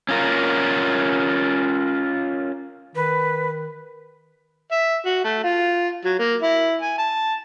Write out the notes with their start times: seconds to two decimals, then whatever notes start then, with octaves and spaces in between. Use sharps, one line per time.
0.09 C#4 F4 A#4
2.95 D#3 B4
4.72 E5
5.06 F#4
5.24 A3
5.43 F4
6.04 F#3
6.19 A#3
6.42 E4
6.81 G#5
6.98 A5